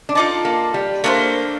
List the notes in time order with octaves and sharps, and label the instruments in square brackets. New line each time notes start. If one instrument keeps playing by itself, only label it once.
[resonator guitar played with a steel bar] D4
[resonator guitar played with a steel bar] D#4 [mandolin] F4 A4 D5 A5
[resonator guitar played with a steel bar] A#3
G3
[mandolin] A3 D4 A4 C5 [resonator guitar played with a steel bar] A#3